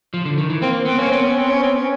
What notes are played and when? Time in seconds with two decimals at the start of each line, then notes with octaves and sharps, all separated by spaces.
0.14 F3
0.25 D3
0.38 D#3
0.50 E3
0.62 A#3 C4
0.85 B3 C4
0.98 A#3 C#4
1.11 B3 C4
1.25 C#4
1.38 C4
1.51 C#4
1.63 C4
1.76 C#4